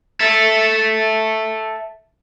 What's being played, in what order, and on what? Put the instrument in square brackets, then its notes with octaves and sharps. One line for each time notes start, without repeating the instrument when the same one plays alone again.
[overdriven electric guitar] A4 E5